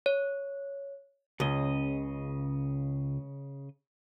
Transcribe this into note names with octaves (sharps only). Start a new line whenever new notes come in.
C#5
C#2 C#3 D#5